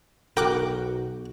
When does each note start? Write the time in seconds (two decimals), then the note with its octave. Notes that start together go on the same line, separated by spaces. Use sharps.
0.37 B1 F#4 A#4 G5 D6 F#6